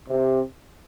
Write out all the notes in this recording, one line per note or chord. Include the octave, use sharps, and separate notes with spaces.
C3